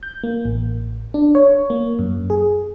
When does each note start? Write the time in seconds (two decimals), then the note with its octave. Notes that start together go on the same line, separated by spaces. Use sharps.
0.03 G6
0.23 A#3
0.45 A1
1.14 D4
1.35 C#5
1.70 A#3
1.99 F#2
2.30 G#4